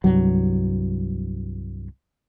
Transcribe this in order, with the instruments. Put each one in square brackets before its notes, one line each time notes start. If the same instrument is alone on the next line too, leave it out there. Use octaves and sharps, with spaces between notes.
[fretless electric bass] C2 G2 F#3